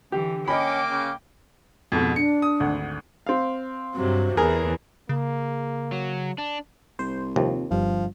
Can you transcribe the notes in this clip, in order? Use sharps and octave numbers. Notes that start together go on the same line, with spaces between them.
D3 E3 G4
A#3 C#4 D#5 G5 B5 D6
C#3
F2 G#2 B2
D4 C#7
D#6
G#1 D2
C4 F5
G2 C3 F#3
E2 E3 G#4 A#4
C#3 A#3
F#3
D4
C2 C5
D#2 C3 F3
G1 G2 F3